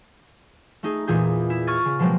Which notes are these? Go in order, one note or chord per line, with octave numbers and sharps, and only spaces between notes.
A3 D#4 G#4
E2 A#2 E3 G#4 G6
E4
C#6 F6 G#6 A6 D#7
C#3
B2 F3 F#3 G#3 A#3 C4